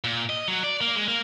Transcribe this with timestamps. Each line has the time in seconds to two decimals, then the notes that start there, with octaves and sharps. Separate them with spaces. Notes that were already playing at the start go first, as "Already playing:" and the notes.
0.04 A#2
0.29 D#5
0.48 F#3
0.64 D5
0.81 A#3
0.96 G#3
1.08 A#3